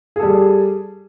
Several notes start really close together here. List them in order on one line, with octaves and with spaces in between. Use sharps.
G#4 A4 G3